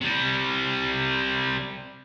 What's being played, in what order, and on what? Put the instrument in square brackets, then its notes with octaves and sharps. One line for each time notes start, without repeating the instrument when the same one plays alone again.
[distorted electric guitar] C3 G3